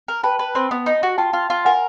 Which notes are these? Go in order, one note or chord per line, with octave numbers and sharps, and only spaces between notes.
A#4
B4 G5 A5
B4
C4
B3
D#4
F#4
F4 G5 A5
F4
F4
A#4 F#5 G#5